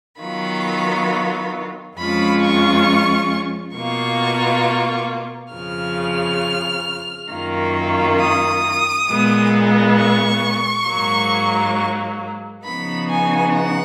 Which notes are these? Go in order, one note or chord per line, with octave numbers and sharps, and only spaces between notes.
D#3 F#3 B3 F4 B5
F2 F3 G#3 C#4 F4 B5
C#6
B2 A#3 F4 C#6
F2 C#3 F3 F6
F#2 D#3 A#3 F4
D#6
A#2 G#3 B3
C#6
G#2 F#3 A#3
C#3 F3 B3 D#4 B5
G#5
F#5